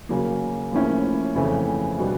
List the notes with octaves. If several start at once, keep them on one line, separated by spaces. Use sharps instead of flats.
C#3 F#3 A#3
A2 F3 A#3 C#4 E4
F2 C#3 E3 A3 C4
B2 G3 B3 D4